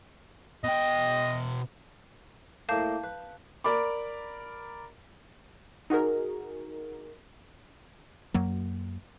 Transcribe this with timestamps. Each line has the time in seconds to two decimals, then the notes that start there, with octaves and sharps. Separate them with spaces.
0.64 B2 D#5 G5
2.69 A2 A#3 F5 A5 G6
3.04 B4
3.64 A#4 D5 B5 D6
5.90 D#4 F#4 G#4 A#4
8.34 F#2 F#3 A#3